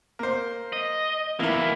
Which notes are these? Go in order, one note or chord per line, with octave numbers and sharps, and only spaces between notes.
A#3 C5
D#5
E3 A#3 E4 A#4